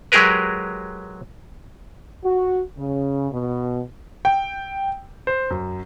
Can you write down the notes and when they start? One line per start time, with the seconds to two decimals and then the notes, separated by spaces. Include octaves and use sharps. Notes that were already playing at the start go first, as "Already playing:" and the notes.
0.12 F#3 G#3 G4 G#4 A#4 B4
2.24 F#4
2.77 C#3
3.31 B2
4.25 G5
5.27 C5
5.50 F#2